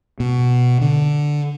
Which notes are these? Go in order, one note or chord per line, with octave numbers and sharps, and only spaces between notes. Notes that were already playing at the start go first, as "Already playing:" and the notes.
B2
D3